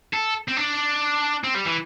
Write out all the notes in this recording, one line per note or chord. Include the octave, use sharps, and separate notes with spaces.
A4
C4
D4
C4
G3
E3